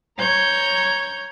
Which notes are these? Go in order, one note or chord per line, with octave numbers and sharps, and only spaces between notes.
C#5 A#5 G6 G#6